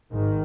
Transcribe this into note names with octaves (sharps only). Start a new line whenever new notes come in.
G#1 G#2 D#3